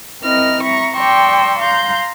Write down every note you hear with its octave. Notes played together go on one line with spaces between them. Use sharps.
C4 E4 A#4 D#5 F6
E5 A#5 C#6
D5 G5 A#5 C6 C#6 E6
F5 A#5 C6 G6